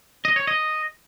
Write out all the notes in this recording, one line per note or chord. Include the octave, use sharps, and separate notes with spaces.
D#5
C#5
D#5